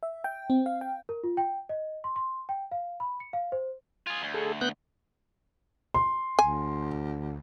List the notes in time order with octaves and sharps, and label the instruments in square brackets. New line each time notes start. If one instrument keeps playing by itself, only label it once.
[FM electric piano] E5
G5
C4
F5
G5
[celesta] A#4
F4
G5
D#5
C6
C6
G5
F5
B5
C#7
F5
C5
[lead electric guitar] F4 G#4 [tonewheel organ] G#5
[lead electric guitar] D2
[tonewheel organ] G#4 A4
B3 F#6 G6
[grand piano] C6
[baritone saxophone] D2 [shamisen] G#5